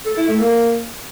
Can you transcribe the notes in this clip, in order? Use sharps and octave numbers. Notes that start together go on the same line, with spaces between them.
A4
E4
A3
A#3